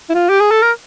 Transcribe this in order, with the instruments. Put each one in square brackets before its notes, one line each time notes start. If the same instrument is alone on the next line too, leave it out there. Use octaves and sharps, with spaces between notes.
[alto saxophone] E4
F4
G4
G#4
A4
A#4